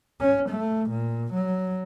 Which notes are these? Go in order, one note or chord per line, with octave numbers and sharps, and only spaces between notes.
C#4
A3
A#2
F#3